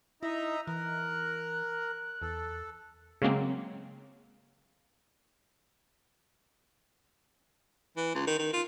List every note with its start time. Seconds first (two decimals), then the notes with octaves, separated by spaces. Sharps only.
0.23 D#4 E4 D#5 E5 A#5
0.67 E3 A#4 F#6
2.22 E2 A4
3.22 C#3 F#3 G#3 A#3 C4
7.97 E3
8.15 C#2
8.27 D#3
8.39 D#3
8.53 F4